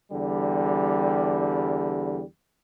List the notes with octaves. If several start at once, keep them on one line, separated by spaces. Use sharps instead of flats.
E2 D3 G3